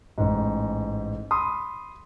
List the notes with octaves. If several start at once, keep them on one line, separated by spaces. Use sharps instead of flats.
A1 G#2
B5 C6 D#6